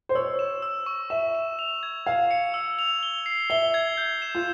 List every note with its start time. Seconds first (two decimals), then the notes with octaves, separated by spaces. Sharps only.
0.09 C5
0.15 C#5 E6
0.39 E7
0.62 E6
0.86 C#6
1.10 E5 E7
1.35 E7
1.59 F7
1.83 G#6
2.06 F5 G#6
2.31 C#7
2.54 E6
2.79 F7
3.03 G7
3.26 C7
3.50 E5 G7
3.74 G#6
3.97 G6
4.22 E7
4.35 F4